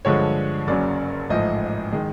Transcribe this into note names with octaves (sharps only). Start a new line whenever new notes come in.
G2 D3 F3 G#3 C#5
F#1 F#2 C#3 F#3 D5
A1 G#2 F3 A3 D#5
D#3 G#3